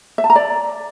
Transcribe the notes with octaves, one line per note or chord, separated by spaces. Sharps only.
E5
A5
A#5
D5